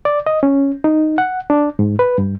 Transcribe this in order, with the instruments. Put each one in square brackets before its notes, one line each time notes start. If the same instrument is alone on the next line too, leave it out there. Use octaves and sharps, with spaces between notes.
[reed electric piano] D5
D#5
C#4
D#4
F#5
D4
G#2
B4
G2